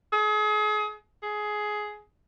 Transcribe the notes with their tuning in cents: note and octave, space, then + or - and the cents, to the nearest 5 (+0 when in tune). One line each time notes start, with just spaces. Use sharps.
G#4 +35
G#4 +15